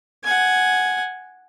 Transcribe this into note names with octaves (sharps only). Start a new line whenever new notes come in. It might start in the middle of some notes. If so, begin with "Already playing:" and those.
F#5 G#5